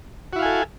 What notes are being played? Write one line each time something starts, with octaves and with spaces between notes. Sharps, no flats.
E4 F#4 A4 F5 G#5